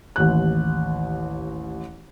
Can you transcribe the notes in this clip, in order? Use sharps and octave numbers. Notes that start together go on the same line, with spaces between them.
A1 D#2 F#6